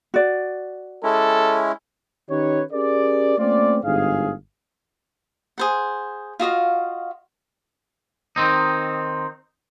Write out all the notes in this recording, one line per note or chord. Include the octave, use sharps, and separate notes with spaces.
F#4 D5
G#3 C#4 E4 A4
D#3 C#4 D#4 G4 B4 C#5
C#4 G4 G#4 A#4 D5
A3 A#3 C4 C#4 F4 D5
G1 G#2 G#4 F5
G#4 C5 F#5
F4 F#4 D#5 F5
D#3 C4 D#4